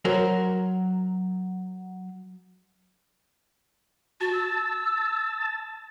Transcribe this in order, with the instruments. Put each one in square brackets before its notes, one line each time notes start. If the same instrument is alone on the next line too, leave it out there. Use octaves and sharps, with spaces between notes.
[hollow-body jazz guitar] F#3 A#4 C5
[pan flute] F#4 [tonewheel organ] A5
[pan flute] E6